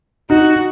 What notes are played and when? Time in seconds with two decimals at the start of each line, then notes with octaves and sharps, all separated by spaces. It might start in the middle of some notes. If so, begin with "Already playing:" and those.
0.30 D#4 F#4